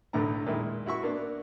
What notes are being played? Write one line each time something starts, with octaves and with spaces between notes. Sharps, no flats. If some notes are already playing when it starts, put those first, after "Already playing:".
B1 E2 A2 D3 A3 A#5
A#2 D#3 G#3 E4
E4 F#4 E5 C#6
A#3 B3 D4